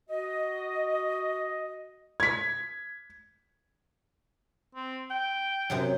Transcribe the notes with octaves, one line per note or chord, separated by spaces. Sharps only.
F#4 D#5
G#6 B6
C4
G5
F#2 C3 F#3